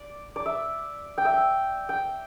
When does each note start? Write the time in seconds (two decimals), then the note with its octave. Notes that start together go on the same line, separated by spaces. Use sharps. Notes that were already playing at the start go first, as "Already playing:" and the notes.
Already playing: D5
0.36 D5
0.46 E5
1.18 G5
1.25 E5
1.33 G5
1.89 G5